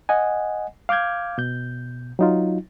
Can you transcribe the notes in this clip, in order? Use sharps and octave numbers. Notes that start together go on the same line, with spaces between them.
D#5 F#5 G#5
F5 D6 F6 G6 G#6
B2 G6
F#3 D#4 F4